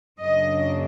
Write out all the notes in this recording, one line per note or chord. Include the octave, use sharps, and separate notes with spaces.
F#2 C#3 F#3 A#3 D4 D#5